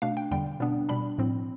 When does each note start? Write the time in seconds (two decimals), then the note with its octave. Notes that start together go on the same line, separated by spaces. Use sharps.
0.02 B2 A3 D4 F5
0.17 G5
0.31 E2 D3 G3 G5
0.60 B2 G3 B3 D4
0.89 B2 G3 D4 B5
1.18 A2 F3 C4